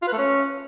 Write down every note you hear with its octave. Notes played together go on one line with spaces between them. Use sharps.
F4
B4
A3
C#4